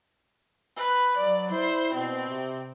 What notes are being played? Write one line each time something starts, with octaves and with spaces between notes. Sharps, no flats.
B4
F#3 D5
E4 C5
B2 C4
C3